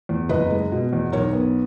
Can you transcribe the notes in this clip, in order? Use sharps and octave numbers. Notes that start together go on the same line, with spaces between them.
E2
F#1 B4 D#5
G#3
B2
E2
B1 A#4 C#5
B3